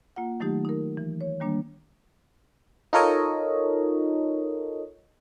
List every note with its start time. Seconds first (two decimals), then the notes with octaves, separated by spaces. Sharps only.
0.16 A#3 F4 F#5
0.40 D#3 F#3 A3 D#4 G4
0.65 D#4 A#4
0.97 E3
1.21 C#5
1.41 D#3 G3 A#3 D4
2.93 D#4 F4 A4 A#4 C#5 D#5